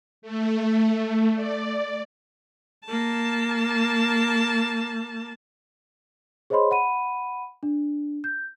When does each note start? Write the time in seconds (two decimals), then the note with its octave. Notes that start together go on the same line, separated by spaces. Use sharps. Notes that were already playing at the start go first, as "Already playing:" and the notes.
0.22 A3
1.35 D5
2.86 A#3 A5
6.50 G#4 C5 C#5 D#5 B5 C6
6.71 F#5 B5 D#7
7.63 D4
8.24 G6